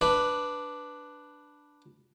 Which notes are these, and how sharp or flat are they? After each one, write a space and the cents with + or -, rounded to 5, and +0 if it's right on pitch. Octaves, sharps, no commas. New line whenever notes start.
D4 +0 B4 +0